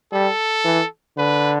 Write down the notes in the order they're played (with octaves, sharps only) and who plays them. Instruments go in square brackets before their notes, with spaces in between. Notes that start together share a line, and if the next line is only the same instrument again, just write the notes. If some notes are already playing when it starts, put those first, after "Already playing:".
[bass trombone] G3 [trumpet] A4
[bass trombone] E3
[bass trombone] D3 [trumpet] B4